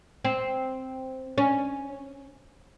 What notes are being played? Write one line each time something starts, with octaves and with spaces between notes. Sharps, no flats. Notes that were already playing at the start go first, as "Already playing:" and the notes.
C4
C#4